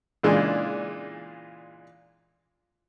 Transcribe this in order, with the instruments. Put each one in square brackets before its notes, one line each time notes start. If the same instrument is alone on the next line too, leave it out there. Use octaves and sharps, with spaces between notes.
[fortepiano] A#2 C#3 E3 G#3 D4 F4